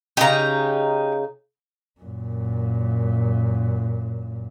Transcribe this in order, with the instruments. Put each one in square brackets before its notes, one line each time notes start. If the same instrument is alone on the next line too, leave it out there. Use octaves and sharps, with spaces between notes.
[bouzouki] C#3 D#4 [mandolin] G4 A#5
[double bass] F#2 A#2